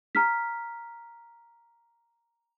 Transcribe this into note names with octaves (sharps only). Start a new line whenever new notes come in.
A#5 F6 B6